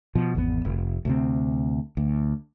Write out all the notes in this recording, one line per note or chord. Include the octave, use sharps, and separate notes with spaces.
B2 F3
G#1 E2 B2 B3
F1
D2 C3 C4
D2